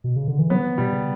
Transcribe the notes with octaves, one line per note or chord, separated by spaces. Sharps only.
B2
C#3
D3
E3
F#3 B3
B2 G3
C#3